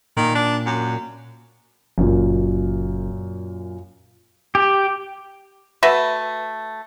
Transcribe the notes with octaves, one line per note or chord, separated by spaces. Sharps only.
A#2 D#3
D4
F#2
F#1 F#2 A#2
G4
A3 F#4 B4 E5